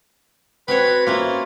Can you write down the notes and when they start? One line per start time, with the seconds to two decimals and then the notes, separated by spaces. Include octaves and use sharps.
0.68 C4 F#4 B4 C#5
1.07 A#3 C#4 E4 F4